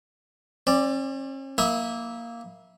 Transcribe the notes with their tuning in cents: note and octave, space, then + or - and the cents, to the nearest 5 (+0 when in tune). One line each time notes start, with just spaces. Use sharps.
C#4 -45 D5 +0
A#3 +0 E4 -15 D#6 +30